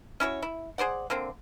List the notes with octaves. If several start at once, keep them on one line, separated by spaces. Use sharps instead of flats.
C#4 E4 F#4 C#5
E4
G#4 C5 D5 F#5
D3 A#3 C4